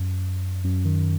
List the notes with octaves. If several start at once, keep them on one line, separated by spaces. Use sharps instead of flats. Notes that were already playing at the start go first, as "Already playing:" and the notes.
Already playing: F#2
F#2
D#3